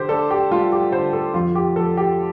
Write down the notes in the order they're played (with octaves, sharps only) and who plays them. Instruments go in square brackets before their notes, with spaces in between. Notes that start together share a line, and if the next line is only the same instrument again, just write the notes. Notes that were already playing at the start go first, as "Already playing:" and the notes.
Already playing: [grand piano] D3 G4 C5
D4 A4
G4
G3 F4
G4
D3 C5
A4
F2 F4
G4
F3 A4
G4